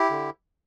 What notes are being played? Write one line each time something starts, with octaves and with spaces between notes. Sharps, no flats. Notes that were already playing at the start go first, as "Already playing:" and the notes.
Already playing: E4 G4
D3